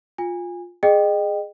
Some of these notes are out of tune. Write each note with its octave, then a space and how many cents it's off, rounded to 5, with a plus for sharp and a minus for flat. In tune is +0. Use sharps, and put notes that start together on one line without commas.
F4 +15 G#5 -25
G#4 +0 D#5 -30 G5 +0